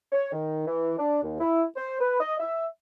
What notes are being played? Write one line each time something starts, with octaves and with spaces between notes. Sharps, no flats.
C#5
D#3
E3
D4
D#2
E4
C5
B4
D#5
E5